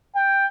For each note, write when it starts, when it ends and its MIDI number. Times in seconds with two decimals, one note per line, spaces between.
0.16 0.46 79